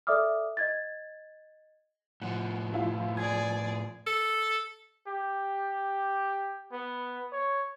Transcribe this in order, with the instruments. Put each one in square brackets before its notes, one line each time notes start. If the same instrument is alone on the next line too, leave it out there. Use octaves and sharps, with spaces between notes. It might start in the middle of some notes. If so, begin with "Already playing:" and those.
[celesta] A4 D5 E5 D6 D#6 F6
D#5 G#6 A6
[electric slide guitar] A2 F3 [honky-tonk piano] F#5
[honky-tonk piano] A3 E4 F4
[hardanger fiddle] G#4 D5 [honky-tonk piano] G#6
[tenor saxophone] A4
[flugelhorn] G4
B3
C#5